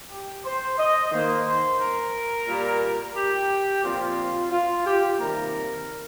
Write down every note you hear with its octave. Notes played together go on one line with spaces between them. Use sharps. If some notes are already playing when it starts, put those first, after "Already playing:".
G4
C5
D#5
D#3 A#3 C5
C5
A#4
A#2 G3 A#3
G4
A#2 F3 C4 F4
F4
G4
C3 D#3 G3 A#3 A#4